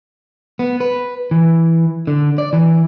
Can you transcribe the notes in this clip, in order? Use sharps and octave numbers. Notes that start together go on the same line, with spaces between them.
B3
B4
E3
D3
D5
E3